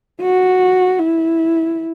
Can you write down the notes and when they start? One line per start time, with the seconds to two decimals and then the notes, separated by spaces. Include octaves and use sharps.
0.22 F#4
0.99 E4